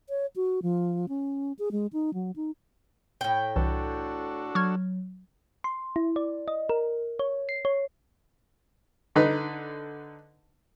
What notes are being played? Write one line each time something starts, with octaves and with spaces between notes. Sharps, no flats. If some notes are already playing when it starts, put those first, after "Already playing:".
C#5
F#4
F3
C#4
G#4
G#3
D#4
F#3
D#4
A2 G5
C2 E3 D4 F#4 A4
F#3 C#6 F6 G#6
C6
E4
D5
D#5
A#4
C#5
C7
C#5
D3 D#4 B4